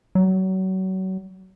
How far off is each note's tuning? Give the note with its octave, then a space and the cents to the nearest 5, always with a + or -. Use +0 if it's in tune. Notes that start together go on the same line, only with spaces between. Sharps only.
F#3 +30